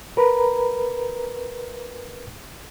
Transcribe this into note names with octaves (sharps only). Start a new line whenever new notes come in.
A#4 B4 A#5 B5